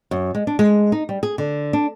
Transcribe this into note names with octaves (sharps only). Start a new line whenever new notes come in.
F#2
G#3
D4
G#3
D#4
G3
G#4
D3
D4